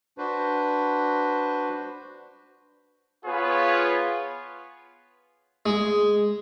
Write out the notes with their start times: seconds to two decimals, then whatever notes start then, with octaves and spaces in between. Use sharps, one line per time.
0.18 D4 F#4 B4 C5
3.26 B3 F4 G#4 B4 C#5
5.66 G#3